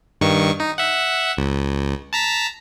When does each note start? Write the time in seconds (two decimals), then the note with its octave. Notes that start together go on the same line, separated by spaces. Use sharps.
0.21 G2 D#3 C#6
0.60 D#4
0.78 E5 F#5
1.37 C#2
2.13 A5 A#5 B6